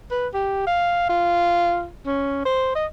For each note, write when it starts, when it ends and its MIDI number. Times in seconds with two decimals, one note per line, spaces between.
0.11 0.28 71
0.34 0.63 67
0.67 1.08 77
1.09 1.89 65
2.06 2.41 61
2.46 2.75 72
2.75 2.86 75